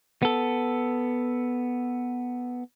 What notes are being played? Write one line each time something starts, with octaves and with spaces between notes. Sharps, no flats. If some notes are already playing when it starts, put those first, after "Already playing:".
B3 A4